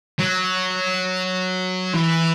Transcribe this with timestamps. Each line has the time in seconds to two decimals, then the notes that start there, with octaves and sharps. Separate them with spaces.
0.19 F#3
1.94 E3